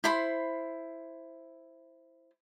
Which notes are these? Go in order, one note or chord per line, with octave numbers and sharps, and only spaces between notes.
E4 C5 B5 C6